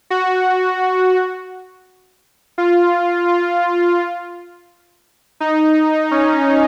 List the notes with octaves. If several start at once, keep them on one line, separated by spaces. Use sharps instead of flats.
F#4
F4
F4
D#4
C#4